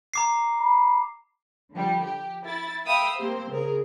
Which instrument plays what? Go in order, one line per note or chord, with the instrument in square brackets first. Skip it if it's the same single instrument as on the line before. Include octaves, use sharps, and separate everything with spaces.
[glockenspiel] A#5 D6 C7
[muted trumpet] B5
[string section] D3 F3 G3
G4
E4 A6
E5 F5 G5 B5 D#6 E6
A#3 C4 G4 C5
C#3 G#4 A#4